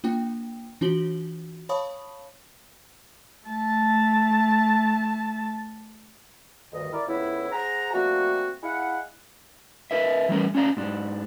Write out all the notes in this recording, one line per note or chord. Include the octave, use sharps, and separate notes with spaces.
A#3 D4 F4 G5
E3 D4 F4 F#4 F#7 G7
C#5 F5 A5 B5 C#6 D#6
A3 A5
D2 G2 D#3 D#5
E4 A#4 D5
F2 C#3 B3 C#4 E4
G#4 C5 F#5 G#5 A#5
F3 G3 A3 A#3 C4 F#4
E4 G#4 D#5 F5 F#5
A#4 B4 E5
E3 F#3 G3 A3 C#4 A#4
C#4 D4 F5 F#5 A#5
G#2 D4